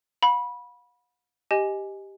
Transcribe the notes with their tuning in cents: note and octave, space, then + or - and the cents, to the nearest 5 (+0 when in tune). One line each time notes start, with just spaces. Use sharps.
F5 +45 B5 -20
G4 +0 D#5 +0 G#5 +0